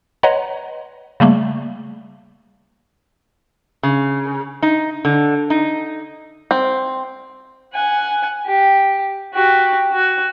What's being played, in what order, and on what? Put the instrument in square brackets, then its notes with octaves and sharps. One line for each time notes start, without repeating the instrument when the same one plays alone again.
[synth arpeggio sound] B4 C#5 D#5 F#5 A#5 C6
C#3 G3 A3 A#3
[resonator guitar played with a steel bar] C#3
D#4
D3
D#4
[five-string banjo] C4
[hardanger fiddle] F#5 G#5
G4
F#4 G4
F#4